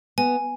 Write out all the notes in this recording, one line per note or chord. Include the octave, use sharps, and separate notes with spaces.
B3 G#5